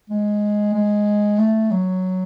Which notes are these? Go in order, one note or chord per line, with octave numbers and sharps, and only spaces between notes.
G#3
G#3
A3
F#3